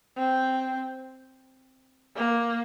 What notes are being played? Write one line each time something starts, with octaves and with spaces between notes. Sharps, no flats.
C4
A#3